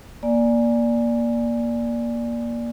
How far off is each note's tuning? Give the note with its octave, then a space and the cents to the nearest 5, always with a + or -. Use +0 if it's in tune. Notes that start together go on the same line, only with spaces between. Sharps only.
A#3 +20 D5 +0 G#5 +0